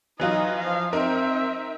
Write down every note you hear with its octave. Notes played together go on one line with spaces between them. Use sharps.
E3 F#3 D#4 F4 D#5
F3 F5
C4 D#4 A#4 E5